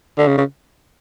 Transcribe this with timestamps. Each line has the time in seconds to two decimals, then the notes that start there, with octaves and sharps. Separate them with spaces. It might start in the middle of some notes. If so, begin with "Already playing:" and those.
0.18 D3
0.28 C#3
0.38 C#3